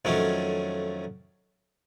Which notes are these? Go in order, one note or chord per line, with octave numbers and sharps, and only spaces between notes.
F2 D#3 F#3 A3 C#4